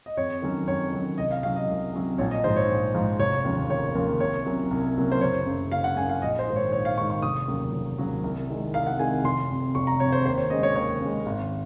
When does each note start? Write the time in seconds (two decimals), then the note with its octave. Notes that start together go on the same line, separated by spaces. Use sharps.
0.06 D#5
0.17 F2 C#5
0.42 D#3 F#3 C#4
0.67 F2 C#5
0.92 D#3 F#3 C#4
1.18 C2 D#5
1.31 F5
1.43 C3 F#3 C#4 F5
1.56 D#5
1.68 C2
1.93 C3 F#3 C#4
2.18 A#1 C#5
2.31 D#5
2.44 G#2 F3 C5
2.56 C#5
2.69 A#1
2.94 G#2 F3
3.19 F1 C#5
3.44 D#2 C#3 F3 A#3
3.70 F1 C#5
3.95 D#2 C#3 F3 A#3
4.20 C2 C#5
4.46 C3 F#3 A#3 C#4
4.71 C2
4.96 C3 F#3 A#3 C#4
5.12 C5
5.21 F#1 C#5
5.46 F#2 C#3
5.72 F#1 F5
5.84 F#5
5.97 F#2 C#3 G#5
6.09 F5
6.22 A#1 D#5
6.39 C5
6.47 G#2 D#3
6.56 C#5
6.72 A#1 C#5
6.85 F5
6.98 G#2 D#3 C#6
7.10 C#6
7.22 F1 D#6
7.48 D#2 C#3 F#3
7.73 F1
7.98 D#2 C#3 F#3
8.24 C2
8.48 C3 D#3 G#3
8.74 C2 F5
8.87 F#5
8.99 C3 D#3 G#3 G#5
9.24 F1 C6
9.49 F2 C3
9.75 F1 C#6
9.87 A#5
10.00 C3 C#5
10.03 F2
10.12 C5
10.25 D#2 C5
10.38 C#5
10.50 C#3 G#3 D#5
10.63 C#5
10.76 D#2 C#5
11.01 C#3 G#3
11.26 G#1